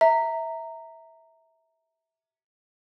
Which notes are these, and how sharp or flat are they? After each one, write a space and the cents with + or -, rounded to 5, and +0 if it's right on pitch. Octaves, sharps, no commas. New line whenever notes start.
E5 -15 A#5 -15